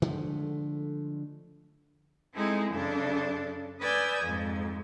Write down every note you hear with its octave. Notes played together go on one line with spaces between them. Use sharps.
D3 F3 G#3 A3
G#3 C4 D#4 E4 G#4 A4
F#2 C#3 D4 A4
B4 D5 G#5 D#6 E6 G6
F2 G#2